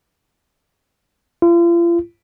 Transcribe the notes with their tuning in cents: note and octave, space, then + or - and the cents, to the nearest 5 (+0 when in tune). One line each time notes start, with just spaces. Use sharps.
F4 -40